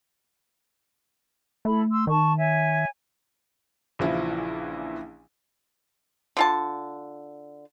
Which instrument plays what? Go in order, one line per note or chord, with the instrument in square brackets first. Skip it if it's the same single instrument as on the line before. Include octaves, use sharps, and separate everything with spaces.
[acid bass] A3 [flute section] E4 A4 B5
[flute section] C6 E6
[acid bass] D#3 [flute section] A5 C#6
[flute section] C#5 E5 G#5
[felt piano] A#1 C#3 E3 F3 E4
[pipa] D3 F4 A5